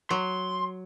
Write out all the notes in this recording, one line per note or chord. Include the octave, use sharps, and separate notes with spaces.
F#3 C6